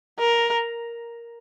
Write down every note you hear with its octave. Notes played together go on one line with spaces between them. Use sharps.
A#4